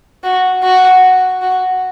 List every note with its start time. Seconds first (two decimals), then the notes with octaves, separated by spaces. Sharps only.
0.23 F#4
0.63 F#4
1.42 F#4